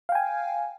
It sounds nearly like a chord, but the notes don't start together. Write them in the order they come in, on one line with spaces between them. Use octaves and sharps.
F5 G5 G#5